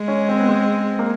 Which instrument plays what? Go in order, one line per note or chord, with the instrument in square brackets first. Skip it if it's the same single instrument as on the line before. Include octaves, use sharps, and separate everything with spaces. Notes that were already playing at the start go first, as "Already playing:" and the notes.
Already playing: [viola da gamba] G#3
[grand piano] C#4
C4
B3
C4
A#3